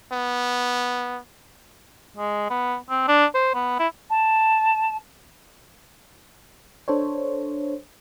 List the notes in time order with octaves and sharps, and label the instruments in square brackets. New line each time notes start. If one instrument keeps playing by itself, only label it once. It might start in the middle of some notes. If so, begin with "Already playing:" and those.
[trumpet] B3
[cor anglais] G#3
B3
C4
D4
C5
B3
E4
[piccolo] A5
[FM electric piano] D4 A4 C5 C#5